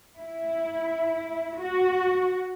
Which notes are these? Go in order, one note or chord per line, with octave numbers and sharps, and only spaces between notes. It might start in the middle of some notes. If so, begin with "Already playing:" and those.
E4
F#4